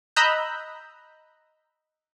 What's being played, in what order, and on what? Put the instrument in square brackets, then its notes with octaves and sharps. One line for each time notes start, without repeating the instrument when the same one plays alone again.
[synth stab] D#5 A#5 B5 E6 F#6 G6